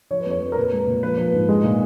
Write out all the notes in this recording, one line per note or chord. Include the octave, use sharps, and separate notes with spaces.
F3 C#5
B4
F2 C#5
F2
A#4
A#2 B4
G#3
A#2
F3 B4
F3
G#2
G#3
A#2